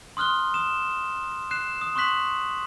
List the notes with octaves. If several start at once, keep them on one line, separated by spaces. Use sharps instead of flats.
C6 D#6 F6 F#6 G7
D#6 E7
F#6 C7 E7
D#6
C6 C#6 D#6 F#6 B6 F#7